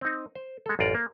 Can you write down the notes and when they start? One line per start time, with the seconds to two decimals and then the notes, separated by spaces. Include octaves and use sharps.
0.01 C4 D#4
0.35 C5
0.66 G#3 A4
0.79 A1 F#2 F4 D5 A#5
0.95 A#3